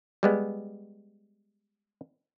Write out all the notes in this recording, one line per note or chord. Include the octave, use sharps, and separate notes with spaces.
G3 G#3 B3